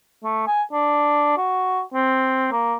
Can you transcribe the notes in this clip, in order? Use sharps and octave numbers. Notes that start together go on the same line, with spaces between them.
A3
G#5
D4
F#4
C4
A#3